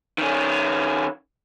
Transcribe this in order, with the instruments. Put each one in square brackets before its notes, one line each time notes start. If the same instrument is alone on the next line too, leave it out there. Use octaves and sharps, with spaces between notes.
[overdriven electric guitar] D#3 C#4